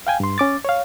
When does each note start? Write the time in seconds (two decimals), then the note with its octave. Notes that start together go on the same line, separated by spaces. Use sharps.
0.07 F5 G5 G#5
0.20 G2 C6
0.38 C#4 D6 A6
0.65 C#5 F5